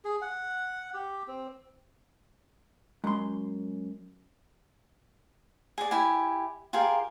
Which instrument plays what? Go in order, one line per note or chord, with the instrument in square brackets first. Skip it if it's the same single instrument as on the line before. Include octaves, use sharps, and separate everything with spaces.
[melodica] G#4
F#5
G4
C4
[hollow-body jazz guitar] F#2 C6 [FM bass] G#3
[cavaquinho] G#4 D5
E4 G4 G#5
F4 G4 G#4 A#4